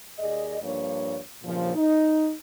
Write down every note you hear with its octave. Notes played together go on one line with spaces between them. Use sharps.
D#2 G#4 D5 D#5
G2 F3 A#3 D4 C#5
G2 A#2 C#3 F3
D#4